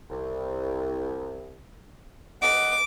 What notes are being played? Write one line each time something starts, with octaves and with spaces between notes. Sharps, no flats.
C2
D#5 F#5 D6